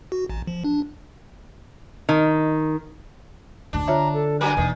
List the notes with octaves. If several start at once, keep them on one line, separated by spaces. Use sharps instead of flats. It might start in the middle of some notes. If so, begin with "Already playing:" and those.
F#4
A1
F3
D4
D#3
F1 D2 A2 D4
D3 F4 C#5 E5 A#5
A4
G2 F#3 A#4 G#5
E1 D#2 B2 D#3 E3